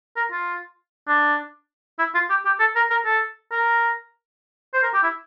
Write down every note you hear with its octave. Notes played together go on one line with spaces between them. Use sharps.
A#4
F4
D4
E4
F4
G4
G4
A4
A#4
A#4
A4
A#4
C5
A#4
G4
E4